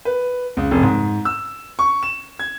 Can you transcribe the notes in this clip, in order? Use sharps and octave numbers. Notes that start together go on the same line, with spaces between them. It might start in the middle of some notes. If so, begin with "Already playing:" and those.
B4
C#2
F1
G#2
E6
C#6
E7
G#6